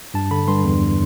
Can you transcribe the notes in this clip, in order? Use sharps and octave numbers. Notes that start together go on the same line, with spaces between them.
G2 A5
D3 B5
G2 C6
E2